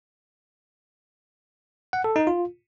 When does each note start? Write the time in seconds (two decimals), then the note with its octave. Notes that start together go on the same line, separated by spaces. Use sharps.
1.93 F#5
2.04 A4
2.16 D#4
2.27 F4